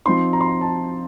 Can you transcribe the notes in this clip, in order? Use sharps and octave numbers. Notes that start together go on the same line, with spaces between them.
F3 C4 D#4 C6
A#5
C6
A#5
A5